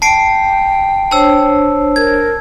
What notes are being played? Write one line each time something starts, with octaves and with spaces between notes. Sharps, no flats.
G5 A5 C7 D7
D4 C5 C#5 A5 E6
A#4 G#6